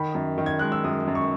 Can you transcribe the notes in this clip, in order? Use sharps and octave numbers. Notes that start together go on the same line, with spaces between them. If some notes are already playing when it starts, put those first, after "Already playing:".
Already playing: D#3 B5
F#2
D#3
G#6
G#3 F#6
E6
F#2 D#6
F#2
C#6